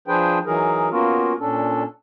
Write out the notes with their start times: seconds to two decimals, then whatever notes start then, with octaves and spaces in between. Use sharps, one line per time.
0.08 F3 D4 G#4 B4 C5 G5
0.46 E3 F#3 D#4 G#4 A#4
0.91 A#3 B3 C#4 F4 F#4 A#4
1.40 A#2 C#4 D4 A4